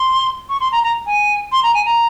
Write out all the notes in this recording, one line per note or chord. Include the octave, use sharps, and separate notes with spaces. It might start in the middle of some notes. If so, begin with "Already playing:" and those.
Already playing: C6
C#6
C6
A#5
A#5
G#5
C6
A#5
G#5
A#5